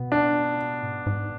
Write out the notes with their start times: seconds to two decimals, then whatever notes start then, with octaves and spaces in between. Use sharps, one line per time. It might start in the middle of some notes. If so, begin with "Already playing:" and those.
Already playing: B2 B3
0.12 D4
0.83 G#2
1.06 G#2